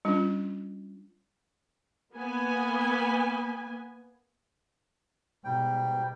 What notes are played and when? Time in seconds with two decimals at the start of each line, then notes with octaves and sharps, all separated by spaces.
0.05 G3 C#4 D4 F4
2.14 A#3 B3 G#5
5.44 G#2 B2 G3 G5